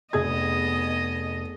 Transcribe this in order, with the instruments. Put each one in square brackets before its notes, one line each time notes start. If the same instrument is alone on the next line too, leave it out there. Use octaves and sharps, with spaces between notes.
[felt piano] F1 G#4 G#6 [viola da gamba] B3 D#5